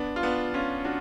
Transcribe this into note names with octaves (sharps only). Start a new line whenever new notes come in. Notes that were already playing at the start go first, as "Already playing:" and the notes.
Already playing: B3 D4
F4
B3 D4
C#4 F4
D4 F#4